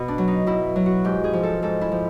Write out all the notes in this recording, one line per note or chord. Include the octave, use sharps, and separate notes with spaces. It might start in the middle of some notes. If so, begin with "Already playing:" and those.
Already playing: B2
D4
F#3
D#4
B2 E4
F#3
F#4
G#2 G4
G#4
F3
A4
G#2 A4
E4
F3